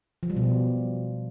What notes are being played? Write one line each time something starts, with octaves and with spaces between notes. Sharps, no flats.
F3
G3
B2